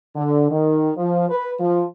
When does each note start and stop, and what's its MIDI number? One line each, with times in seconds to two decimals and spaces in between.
0.16 0.49 50
0.51 0.91 51
0.97 1.26 53
1.30 1.53 71
1.60 1.84 53